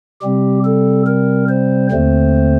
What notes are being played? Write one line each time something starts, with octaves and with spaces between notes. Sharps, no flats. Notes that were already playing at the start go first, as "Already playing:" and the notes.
C3 G3 C4 G4
A4
A#4
C5
D#2 D3 A3 C4 C5